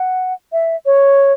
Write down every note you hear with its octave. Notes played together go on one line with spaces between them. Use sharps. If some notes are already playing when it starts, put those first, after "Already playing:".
Already playing: F#5
E5
C#5